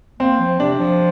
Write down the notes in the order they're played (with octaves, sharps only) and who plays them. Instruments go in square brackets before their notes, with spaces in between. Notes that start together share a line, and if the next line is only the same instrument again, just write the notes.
[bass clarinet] A#3 [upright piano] C4
[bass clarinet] F3
[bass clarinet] C3 [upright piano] D4
[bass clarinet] F3